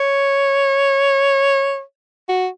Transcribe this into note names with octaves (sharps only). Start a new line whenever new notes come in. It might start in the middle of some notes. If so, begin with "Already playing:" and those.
Already playing: C#5
F#4